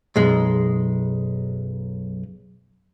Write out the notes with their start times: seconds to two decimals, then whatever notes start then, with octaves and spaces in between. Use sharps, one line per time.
0.16 B1 F#2 G#3